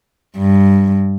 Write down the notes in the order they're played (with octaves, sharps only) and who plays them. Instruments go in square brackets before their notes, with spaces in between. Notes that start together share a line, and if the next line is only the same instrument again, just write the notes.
[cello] G2